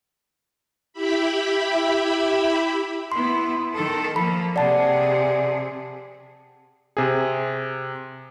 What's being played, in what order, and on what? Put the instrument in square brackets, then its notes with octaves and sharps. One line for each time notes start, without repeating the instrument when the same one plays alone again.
[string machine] E4 G4 E5 B5
[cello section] B3 E4 [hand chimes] C6
[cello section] D#3 A4
[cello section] F3 A#3 [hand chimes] A4 B5
[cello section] C3 G#4 [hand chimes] D5 F#5 A5
[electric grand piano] C3 G#4